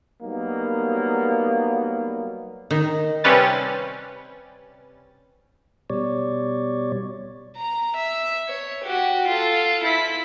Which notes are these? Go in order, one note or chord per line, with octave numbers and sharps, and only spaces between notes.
F#3 G3 A#3 B3 D#4
D#3
C3 G3 C#4 B4 A6
B2 G3 C#5 D5
A#5
E5
C#5
F#4 G4
F4 A4
E4 B6